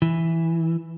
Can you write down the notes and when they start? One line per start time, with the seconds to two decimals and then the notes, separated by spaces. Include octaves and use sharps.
0.02 E3